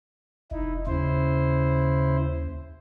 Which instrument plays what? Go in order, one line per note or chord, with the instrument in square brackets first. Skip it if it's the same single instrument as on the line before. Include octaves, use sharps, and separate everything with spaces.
[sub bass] F1 [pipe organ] D#4 E4
[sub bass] D#2 [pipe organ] C#3 E4 C5